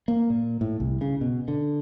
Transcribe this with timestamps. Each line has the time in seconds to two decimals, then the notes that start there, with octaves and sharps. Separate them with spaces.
0.08 A#3
0.30 A#2
0.61 A2
0.80 C2
1.01 C#3
1.21 B2
1.48 D3